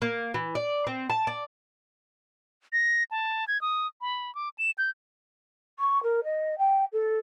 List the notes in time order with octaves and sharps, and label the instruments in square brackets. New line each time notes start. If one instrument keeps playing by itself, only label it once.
[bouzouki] A#3
E3
D5
C4
A5
D5
[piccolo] A#6
A5
G#6
D#6
B5
D6
E7
G6
[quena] C#6
A#4
D#5
G5
A4